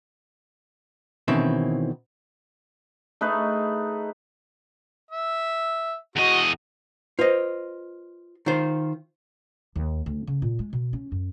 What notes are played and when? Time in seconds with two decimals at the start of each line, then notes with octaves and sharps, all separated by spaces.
1.28 B2 D#3 E3 C4 C#4 E4
3.21 A3 D#4 G#4 B4
5.11 E5
6.16 E2 F#4 D#5
7.19 F4 B4 C5 D#5
8.46 D#3 F4 C5
9.76 D#2
10.06 D2
10.27 C#3
10.42 A#2
10.59 G#3
10.73 B2
10.93 C#4
11.12 F#2